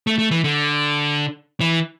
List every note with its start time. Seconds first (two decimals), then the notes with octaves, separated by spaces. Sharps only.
0.07 A3
0.19 A3
0.31 E3
0.44 D3
1.61 E3